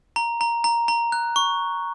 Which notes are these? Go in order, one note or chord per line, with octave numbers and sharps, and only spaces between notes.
A#5
A#5
A#5
A#5
F#6
C#6